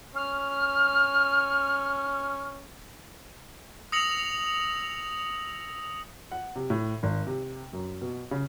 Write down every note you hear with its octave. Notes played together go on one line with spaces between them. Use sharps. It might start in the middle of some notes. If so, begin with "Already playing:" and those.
C#4 F6
D#6 E6 A#6 C#7 F7 F#7
F#5
C3
A2
G#1
C3
F#2
B2
C#3